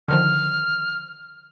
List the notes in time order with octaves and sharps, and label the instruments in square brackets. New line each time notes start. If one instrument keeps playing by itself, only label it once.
[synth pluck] D3 D#3 F3 [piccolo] F6